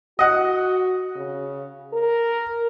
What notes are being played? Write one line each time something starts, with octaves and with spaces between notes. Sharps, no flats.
F#4 D#5 F#5
C#3
A#4